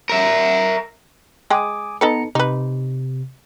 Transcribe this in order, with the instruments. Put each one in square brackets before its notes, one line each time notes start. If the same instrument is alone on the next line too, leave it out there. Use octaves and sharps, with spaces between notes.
[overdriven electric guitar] A#4 E5
[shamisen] G#3 G#4 G5 [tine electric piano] G#5 D6 D#6
[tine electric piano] B3 A#5 C#7 [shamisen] D#4 A4 B4
[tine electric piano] C3 [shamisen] D#4 B4